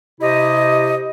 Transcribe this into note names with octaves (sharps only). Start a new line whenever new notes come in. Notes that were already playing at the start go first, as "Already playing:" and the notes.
C3 E4 G4 C5 D#5